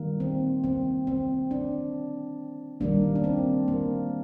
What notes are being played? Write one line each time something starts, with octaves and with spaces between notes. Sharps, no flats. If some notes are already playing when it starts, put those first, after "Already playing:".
Already playing: D#3 G3 A#3
C4
C4
C4
D4
D#3 G3 A#3 D4
D4
C4
A#3